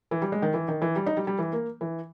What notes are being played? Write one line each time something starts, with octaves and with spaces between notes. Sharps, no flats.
E3
G3
G#3
D#3
E3
D#3
E3
G3
D#4
G3
G3
E3
A#3
E3